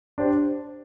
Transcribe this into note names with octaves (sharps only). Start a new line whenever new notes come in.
D4 G4 C5